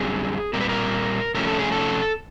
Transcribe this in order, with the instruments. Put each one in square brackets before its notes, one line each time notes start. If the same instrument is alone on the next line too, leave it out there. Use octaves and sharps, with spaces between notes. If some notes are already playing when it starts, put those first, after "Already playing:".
Already playing: [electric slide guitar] F#2 D3 G3 C4 G#4
A#2 G3 C4 A#4
B4
A#4
C3 F3 A3 C#4 A#4
A4
G#4
A4